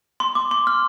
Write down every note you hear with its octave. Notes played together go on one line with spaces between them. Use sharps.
C6
D6
C6
F6